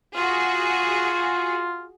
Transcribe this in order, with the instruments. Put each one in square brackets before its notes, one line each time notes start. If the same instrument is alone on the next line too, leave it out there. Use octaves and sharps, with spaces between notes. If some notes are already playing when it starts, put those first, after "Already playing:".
[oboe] F4 [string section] F#4 G#4